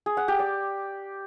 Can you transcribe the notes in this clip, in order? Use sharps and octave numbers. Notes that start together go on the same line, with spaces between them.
G#4
F#5
G4
D5